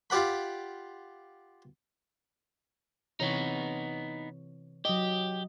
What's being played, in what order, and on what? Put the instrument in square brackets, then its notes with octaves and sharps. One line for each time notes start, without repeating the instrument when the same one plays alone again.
[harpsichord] F4 G4 D5 F#5 B5
[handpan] C3 E3 C#5 [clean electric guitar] B3 D#4
[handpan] F#3 D#5 [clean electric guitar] G4